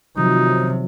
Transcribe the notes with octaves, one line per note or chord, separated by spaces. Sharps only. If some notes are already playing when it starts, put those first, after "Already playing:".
C3 D#3 F3 F#3 D#4